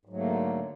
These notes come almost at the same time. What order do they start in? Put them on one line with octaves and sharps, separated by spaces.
G#2 F#3 A3 A#3 D3